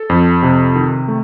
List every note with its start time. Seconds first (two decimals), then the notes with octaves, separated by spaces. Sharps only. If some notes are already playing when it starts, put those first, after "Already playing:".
Already playing: A4
0.10 F2
0.43 C3
0.76 D#3
1.08 A3